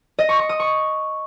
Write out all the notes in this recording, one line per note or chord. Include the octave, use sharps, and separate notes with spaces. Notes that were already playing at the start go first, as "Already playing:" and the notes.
D#5
C#6
C#6
D#6
C#6